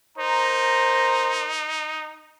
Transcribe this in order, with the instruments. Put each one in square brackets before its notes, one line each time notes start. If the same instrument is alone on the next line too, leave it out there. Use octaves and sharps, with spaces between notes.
[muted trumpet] D#4 [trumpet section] A#4 C5 A#5